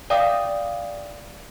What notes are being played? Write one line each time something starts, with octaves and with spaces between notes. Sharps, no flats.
D5 E5 F5 G5 D6 D#6